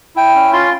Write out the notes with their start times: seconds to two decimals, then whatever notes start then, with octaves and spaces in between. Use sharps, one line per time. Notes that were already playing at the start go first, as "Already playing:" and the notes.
0.16 E4 G5
0.35 C#4
0.53 F4 C6